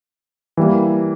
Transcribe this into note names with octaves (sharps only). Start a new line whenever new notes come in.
E3 G3 A#3